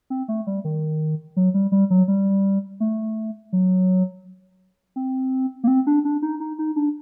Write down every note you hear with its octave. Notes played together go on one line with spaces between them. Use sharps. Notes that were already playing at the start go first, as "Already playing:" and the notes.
C4
A3
G3
D#3
F#3
G3
G3
F#3
G3
A3
F#3
C4
A#3
C4
D4
D4
D#4
D#4
D#4
D4